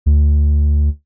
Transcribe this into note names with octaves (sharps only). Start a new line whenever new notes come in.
D2